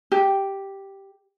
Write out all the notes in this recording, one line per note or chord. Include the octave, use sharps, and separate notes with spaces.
G4